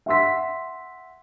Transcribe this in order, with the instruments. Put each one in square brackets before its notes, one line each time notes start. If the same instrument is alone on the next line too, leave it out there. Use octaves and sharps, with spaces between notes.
[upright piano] E5 F#5 C6 E6 B6